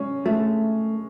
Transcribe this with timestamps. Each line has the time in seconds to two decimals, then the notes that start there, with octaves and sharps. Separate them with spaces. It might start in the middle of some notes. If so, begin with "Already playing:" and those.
Already playing: G#3 C#4
0.26 G#3 A3